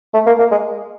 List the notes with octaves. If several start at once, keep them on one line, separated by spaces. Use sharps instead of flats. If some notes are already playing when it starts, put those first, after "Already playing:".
A3
A#3
A#3
G#3